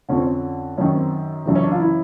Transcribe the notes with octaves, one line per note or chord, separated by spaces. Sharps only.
F2 D3 C#4
C4
C#4
F#2 D#3 C#4
C4
F#2 C#3 E3
C#4
D4
F4
E4